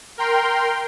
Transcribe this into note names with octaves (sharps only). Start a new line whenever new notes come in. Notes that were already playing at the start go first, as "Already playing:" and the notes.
A#4 G5 C6